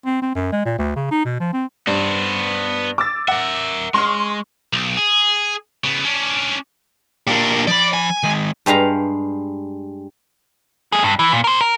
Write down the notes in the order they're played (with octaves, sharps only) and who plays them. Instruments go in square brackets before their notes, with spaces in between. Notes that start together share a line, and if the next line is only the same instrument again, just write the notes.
[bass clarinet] C4
C4
F#2
G#3
A#2
D2
C#3
D#4
B2
F3
C4
[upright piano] G2 [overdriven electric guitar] B3 C5
[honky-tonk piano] D6 E6 A6
[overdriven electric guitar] A#4 E5 [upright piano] F#5
[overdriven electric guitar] G#3 [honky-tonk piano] C6 C#6 F6
[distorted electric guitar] B1
G#4
C#3 B3
C#4 D4
[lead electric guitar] A#2 D4 [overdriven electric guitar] G4 A#4
[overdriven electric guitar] F3 B5 [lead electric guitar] D5
[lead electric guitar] G#5
[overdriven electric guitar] D#3 G#3
[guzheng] G2 G3 G#3 F5 A#5
[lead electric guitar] A3 G#4
G2
E3
A#2
A#4 C5
A#4